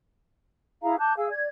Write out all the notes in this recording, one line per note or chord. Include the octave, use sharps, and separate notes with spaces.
E4 G#4 F5 A#5
A5 D6 F#6 G6
G#4 F5 G#5 E6
D5 G#6